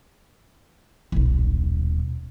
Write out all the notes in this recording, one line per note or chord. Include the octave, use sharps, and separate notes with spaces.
D#1 B1